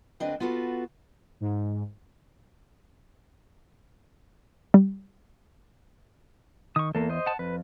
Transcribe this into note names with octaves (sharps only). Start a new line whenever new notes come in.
D2 C4 D4 B4 D#5
B3 F4 F#4 A4 B4
G#2
G3
D#3 C#6 D#6
E2 A#3 A4
C5 D#5
F#5 A5
F2 B4